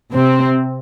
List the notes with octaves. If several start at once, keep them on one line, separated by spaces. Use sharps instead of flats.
C3 C4